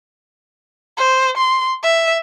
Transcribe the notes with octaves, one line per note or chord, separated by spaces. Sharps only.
C5
C6
E5